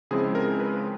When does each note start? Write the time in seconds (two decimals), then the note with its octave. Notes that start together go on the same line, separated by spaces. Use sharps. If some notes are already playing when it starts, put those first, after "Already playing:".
0.11 C#3 F3 G#3 C4 E4 G#4
0.35 A#4
0.60 B4